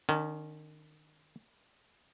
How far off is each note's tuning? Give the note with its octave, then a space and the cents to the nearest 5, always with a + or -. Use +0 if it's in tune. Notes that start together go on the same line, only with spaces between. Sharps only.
D#3 -25 C#4 +30